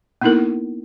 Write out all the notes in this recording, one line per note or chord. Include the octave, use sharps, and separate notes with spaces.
A#3 B3 D#4 E4 A4 A#4